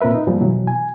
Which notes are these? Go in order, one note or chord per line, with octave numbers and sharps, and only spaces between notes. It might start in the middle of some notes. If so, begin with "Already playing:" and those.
A#2 C4 A#4 B4 E5
D#4
G2 F3 G3 A#3
B2 E3 F#3
G#5